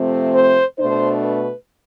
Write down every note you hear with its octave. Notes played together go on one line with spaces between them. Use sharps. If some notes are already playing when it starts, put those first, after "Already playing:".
Already playing: C3 F3 A3 C4
C5
B2 A3 D4 C5
B4